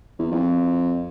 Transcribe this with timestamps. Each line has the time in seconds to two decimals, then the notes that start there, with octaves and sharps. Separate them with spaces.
0.19 E2
0.31 F2